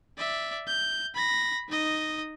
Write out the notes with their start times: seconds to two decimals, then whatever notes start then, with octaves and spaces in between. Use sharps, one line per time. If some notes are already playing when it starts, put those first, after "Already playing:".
0.18 D5 E5
0.67 G6
1.15 B5 A#6
1.69 D#4 D#5